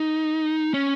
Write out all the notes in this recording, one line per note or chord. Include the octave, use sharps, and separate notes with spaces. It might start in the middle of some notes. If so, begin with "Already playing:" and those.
Already playing: D#4
C#4